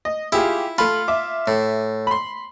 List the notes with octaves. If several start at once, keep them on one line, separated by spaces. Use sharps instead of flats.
D#5
E4 F4 G4 G#4
A3 F4 B5
E5 D6
A2
B5 C6